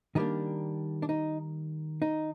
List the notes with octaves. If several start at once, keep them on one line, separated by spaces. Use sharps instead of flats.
D#3 G3 A#3 D4 D#4
D4
D#4
D#4